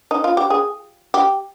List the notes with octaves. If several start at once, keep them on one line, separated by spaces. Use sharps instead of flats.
D#4
F4
G4
G#4
G4